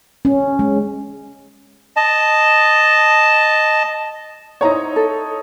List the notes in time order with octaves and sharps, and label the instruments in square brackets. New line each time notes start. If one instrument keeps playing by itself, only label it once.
[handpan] C#4
G#3
[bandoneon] D#5 A5
[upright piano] D#4 E4 C#5 [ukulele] C5 A#5
[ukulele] A4